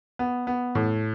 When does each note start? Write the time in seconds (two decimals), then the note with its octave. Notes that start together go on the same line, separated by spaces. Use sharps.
0.19 B3
0.47 B3
0.75 A2